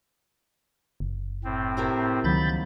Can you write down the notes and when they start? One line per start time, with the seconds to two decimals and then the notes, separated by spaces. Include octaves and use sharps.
1.00 F#1
1.44 A2 C4
1.77 C3 E4 A#4
2.24 C#2 D#3 F#3 A#3 B5 G6 A6